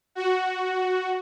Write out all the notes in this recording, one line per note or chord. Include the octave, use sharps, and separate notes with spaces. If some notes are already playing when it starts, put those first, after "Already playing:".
F#4